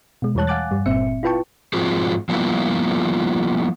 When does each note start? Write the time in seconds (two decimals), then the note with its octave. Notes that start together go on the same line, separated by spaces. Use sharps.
0.22 B2 G#3
0.35 E2 E3 G3 C#5 A5 F#6
0.47 F5 F#5 G#5 D6 F#6 A6
0.71 G2 G3
0.86 G1 A#2 C4 E5 C#7
1.23 E4 F4 B4 G5 A5 C#6
1.73 G#2 F3 C4 F4 F#4 G#4
2.29 F3 G3 A#3 B3 E4 F4